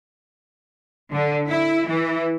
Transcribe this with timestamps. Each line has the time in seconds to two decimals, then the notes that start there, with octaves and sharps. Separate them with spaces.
1.13 D3
1.48 E4
1.87 E3